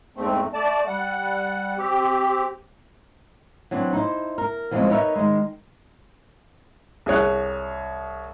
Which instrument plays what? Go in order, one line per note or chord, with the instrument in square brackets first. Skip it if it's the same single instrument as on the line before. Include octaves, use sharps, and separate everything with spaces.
[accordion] E2 G#2 A3 C4
A3 D5 A5
G3 F#5
C4 G4
[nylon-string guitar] E3 F#3 C4 D4
D#4 E4 C5
A#4
E3 F3 G3 G#3 C4 C#4
D#4 A#4 B4 C#5 E5
D#3 G#3
[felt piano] C2 G#4 C#5 F#6